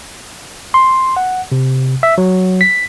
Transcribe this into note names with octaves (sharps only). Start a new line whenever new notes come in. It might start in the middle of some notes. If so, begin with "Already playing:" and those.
C6
F#5
C3
E5
F#3
B6